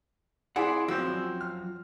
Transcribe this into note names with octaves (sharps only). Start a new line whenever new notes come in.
C4 E4 G#4 D5 F#5 B5
F#2 F3 C4 F#4 E6
F6